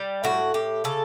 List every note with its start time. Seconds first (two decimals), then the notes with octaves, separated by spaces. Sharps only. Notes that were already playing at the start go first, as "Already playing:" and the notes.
Already playing: G3
0.24 A2 F#4
0.54 A2 G4
0.84 C#3 A4